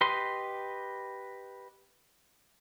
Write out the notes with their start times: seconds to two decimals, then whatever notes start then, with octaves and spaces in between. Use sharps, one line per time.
0.01 G4 B4 D#5 C6